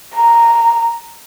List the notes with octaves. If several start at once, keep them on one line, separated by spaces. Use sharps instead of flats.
A#5